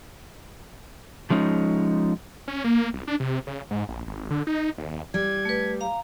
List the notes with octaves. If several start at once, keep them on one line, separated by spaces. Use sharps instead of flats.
F3 G#3 C#4 D#4
C#4
A#3
C2
D4
C3
C#3
G#2
A#1
G#1
D3
D#4
D#2
G3 G#6
A3 B4
F5 A#5